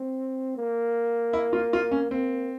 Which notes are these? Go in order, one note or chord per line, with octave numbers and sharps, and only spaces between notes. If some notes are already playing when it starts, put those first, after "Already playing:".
Already playing: C4
A#3
E4
F4
F4
C#4
A#3 C4